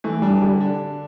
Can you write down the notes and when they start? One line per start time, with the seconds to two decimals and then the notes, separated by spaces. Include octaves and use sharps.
0.04 E3 A3
0.22 G3 D4
0.42 D3 G3
0.60 D4